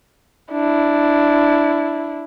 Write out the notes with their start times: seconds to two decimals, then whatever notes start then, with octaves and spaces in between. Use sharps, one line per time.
0.52 D4 E4